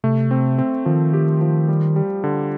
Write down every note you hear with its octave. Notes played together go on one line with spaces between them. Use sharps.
C3 A3
C4
C4
D#3 F3
G4
F3
G3
G3
D3